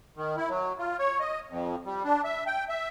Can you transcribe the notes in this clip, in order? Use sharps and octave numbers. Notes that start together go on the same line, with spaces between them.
D#3
E4
F#3
F4
C#5
D#5
F2
G3
D4
E5
G5
E5